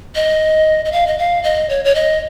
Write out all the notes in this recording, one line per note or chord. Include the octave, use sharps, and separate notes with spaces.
D#5
D#5
F5
D#5
F5
D#5
C#5
C#5
D#5